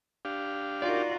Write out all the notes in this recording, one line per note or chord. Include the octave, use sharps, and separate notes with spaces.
D4 G4 F5
D#4 F4 F#4 A#4 D5